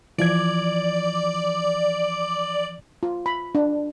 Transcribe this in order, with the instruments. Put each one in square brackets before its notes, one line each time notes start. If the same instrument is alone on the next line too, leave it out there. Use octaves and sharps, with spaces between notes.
[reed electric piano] E3 F3 G#6 [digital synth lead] D5
[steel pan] F4
B5
D4